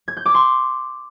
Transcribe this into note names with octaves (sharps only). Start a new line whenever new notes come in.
G#6
G6
D6
C6